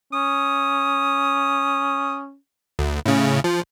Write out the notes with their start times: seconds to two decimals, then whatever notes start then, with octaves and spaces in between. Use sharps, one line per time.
0.13 C#4 D#6
2.79 D2
3.06 A2 C#3
3.44 F3